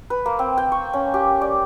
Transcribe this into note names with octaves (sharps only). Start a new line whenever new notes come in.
B4
A#3
C4
G5
C#6
C#4
G4
D5